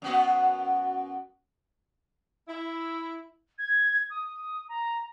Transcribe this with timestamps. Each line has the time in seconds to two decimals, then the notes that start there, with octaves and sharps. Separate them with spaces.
0.02 F#2 B3 F#4
2.48 E4
3.58 G#6
4.09 D#6
4.68 A#5